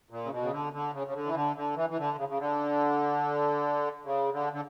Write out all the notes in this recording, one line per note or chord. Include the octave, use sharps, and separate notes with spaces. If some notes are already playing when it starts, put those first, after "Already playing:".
A#2
C#3
B2
C#3
D3
D3
C#3
C#3
D3
E3
D3
D3
E3
E3
D3
C#3
C#3
D3
C#3
D3
D3